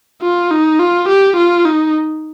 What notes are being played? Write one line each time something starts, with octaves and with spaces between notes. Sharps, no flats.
F4
D#4
F4
G4
F4
D#4